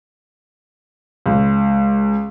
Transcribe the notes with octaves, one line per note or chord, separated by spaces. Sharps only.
C#2